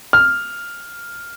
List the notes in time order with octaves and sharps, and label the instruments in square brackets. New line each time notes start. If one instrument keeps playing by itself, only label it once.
[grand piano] F6